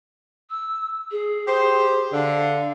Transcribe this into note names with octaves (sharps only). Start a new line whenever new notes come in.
E6
G#4
G4 C5
D3 F5